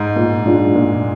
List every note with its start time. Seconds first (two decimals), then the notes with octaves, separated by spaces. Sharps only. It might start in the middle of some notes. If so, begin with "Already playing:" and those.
Already playing: G#2
0.16 A#2
0.45 G#3 D4 F4
0.75 A#2